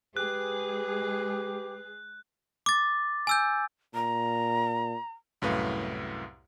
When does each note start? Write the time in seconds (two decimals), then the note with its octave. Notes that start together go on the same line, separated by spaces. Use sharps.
0.17 G#3 G4 G#4 B4 F#6
2.66 D6 A6
3.27 G#5 E6 G6
3.95 A#2 A#5
5.42 C2 F#2 A2 B4 F5